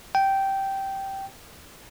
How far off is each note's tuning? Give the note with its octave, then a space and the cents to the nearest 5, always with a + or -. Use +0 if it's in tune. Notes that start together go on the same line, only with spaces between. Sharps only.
G5 -10